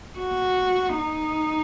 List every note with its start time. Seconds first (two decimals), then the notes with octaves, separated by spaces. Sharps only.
0.19 F#4
0.98 D#4